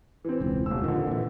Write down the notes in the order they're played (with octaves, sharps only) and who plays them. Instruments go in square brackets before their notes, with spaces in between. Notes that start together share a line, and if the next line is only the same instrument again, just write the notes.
[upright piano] E3 C4
[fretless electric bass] E1 C#2
[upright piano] D#1 E6
[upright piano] F2 D3 [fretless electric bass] D#3
[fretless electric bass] A#2 E3